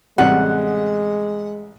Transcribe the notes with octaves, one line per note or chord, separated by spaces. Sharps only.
A1 C3 G3 G#3 F#5